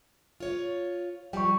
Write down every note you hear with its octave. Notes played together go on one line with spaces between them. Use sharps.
F4 C#5
F3 G3 G5 C#6